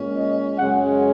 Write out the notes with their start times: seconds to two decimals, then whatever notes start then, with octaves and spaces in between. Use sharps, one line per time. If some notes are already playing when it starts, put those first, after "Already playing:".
Already playing: A#2 G#3 C#4
0.16 D#5
0.58 F#2 C#3 G#3 C#4 F#5